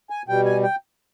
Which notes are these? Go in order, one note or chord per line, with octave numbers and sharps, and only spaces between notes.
G#5
B2 G3 G5
G#5
G5